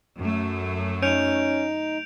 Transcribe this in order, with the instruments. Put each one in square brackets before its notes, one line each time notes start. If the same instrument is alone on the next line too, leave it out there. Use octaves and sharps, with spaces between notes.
[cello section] F#2 A3
[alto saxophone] C#4 [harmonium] D#4 [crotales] G6 D7 F7